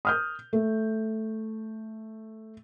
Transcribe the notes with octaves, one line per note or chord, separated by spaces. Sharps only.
D#6 F6 G6
A3